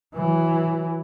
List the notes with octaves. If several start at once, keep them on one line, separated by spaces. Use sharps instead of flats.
E3 F#3